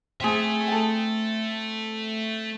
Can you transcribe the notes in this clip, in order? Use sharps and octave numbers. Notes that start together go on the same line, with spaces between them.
A3 C4 G#4 E5
A4 G5